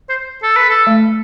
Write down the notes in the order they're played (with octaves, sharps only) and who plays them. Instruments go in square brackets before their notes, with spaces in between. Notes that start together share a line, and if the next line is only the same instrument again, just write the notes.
[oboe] C5
A4
B4
A4
[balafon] A3